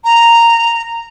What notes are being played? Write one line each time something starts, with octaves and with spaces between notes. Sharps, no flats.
A#5